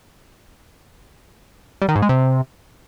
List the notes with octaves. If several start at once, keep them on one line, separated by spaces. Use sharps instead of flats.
G3
D#3
G#2
G#3
C3